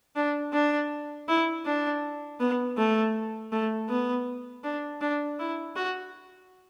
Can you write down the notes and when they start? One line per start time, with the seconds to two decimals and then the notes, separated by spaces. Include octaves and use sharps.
0.16 D4
0.53 D4
1.28 E4
1.66 D4
2.40 B3
2.77 A3
3.52 A3
3.89 B3
4.64 D4
5.01 D4
5.39 E4
5.76 F#4